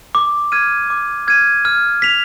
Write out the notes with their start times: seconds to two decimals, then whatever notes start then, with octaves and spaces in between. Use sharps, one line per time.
0.15 D6
0.52 F6 G#6 D#7
0.90 D6
1.27 F6 G#6 D#7
1.65 F6
2.02 B6 F7